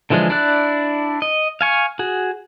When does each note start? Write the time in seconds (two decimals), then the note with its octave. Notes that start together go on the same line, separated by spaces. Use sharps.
0.10 D3 E3 F3 G#3 D4
0.30 D4 E4 D5 F#6
1.22 D#5
1.61 F5 G#5 C#6
1.99 F#4 G#4